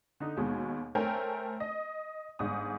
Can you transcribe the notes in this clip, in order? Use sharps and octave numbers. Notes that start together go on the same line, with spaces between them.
D3 D#4
D#2 B2 G#3
A3 A#4 C5 C#5 G5 G#5
D#5
G1 G#2 D#6